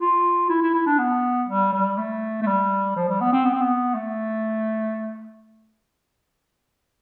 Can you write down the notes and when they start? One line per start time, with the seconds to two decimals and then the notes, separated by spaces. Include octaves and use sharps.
0.01 F4
0.50 E4
0.62 E4
0.74 E4
0.86 D4
0.99 B3
1.49 G3
1.73 G3
1.98 A3
2.42 A3
2.47 G3
2.96 F3
3.09 G3
3.21 B3
3.33 C4
3.45 B3
3.53 C4
3.61 B3
3.94 A3